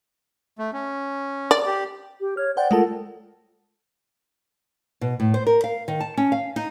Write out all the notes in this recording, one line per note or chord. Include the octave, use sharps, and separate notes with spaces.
A3
C#4
D5
G4
G4
C#5 F6
C5 D5 F#5 G5
G#3 A3 F4 A4 A#4 F#5 A5
B2
A2
C5
A#4
F5
D#3
A5
C#4
F5
D#4